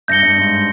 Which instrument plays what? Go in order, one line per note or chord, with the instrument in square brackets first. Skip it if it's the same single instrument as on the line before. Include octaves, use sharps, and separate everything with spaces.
[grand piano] G2 [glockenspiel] G6 A#6 C#7 G7
[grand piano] G2
G#2